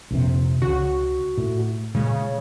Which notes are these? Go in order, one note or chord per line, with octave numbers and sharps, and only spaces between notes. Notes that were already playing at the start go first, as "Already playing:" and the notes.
A#1 F2 C3
C#2 C#3 F#4
A2
A#2 C#3 G#3